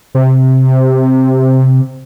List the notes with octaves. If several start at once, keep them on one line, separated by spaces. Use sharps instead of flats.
C3